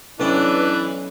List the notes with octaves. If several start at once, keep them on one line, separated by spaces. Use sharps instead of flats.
B1 E3 C#4 D4 B4 G5